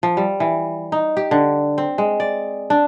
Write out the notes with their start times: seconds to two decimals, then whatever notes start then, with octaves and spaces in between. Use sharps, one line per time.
0.03 F3
0.17 G3
0.40 E3
0.92 D#4
1.17 G4
1.31 D3
1.78 C4
1.98 G#3
2.20 D5
2.70 D4